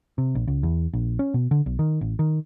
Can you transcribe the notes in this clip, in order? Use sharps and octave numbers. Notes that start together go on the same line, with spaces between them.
C3
A#1
C#2
E2
A#1
C#4
B2
D3
B1
D#3
A1
D#3